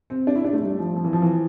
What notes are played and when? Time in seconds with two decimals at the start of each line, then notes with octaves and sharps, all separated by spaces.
0.10 C4
0.27 D4
0.36 E4
0.44 D4
0.53 A3
0.62 G3
0.79 F3
0.96 F3
1.04 E3
1.13 F3
1.22 E3